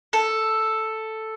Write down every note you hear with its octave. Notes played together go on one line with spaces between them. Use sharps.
A4